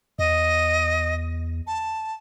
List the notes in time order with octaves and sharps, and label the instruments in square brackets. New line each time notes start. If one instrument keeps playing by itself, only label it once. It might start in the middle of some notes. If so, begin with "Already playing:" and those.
[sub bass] E2 [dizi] D#5
[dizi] A5